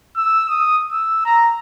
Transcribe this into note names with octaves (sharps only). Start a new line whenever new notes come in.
E6
D#6
E6
A#5